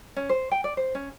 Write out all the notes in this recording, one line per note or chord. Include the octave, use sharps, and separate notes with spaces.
C#4
C5
G5
D5
C5
C#4